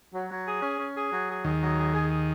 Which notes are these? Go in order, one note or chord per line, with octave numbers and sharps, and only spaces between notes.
F#3
F#3
G#4
C#4
C#4
G#4
F#3
G#4
D#2 D#3 G#4
F#3
G#4
G#4
G#4